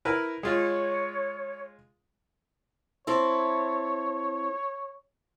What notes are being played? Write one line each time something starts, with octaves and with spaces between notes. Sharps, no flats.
E4 A#4 B4
G#3 F4 C#5
C4 E4 A4 C#5